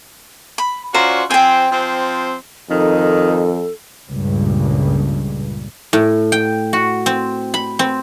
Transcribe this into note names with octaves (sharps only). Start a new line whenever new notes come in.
B5
C#4 F4 F#4 C5 D5 A#5
F3 C4 G5 G#5
F3 C4
F2 D#3 D#4 A4
C#2 G2 A#2
A2
G5
F#4
C4
B5
C4